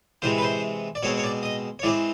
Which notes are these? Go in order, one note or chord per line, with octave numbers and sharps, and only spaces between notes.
C3 E3 G#3 C5
B4
C5
D5
B2 G#3 C4 C#5
C#5
D5
D#5
C#5
E3 G#3 C4 D5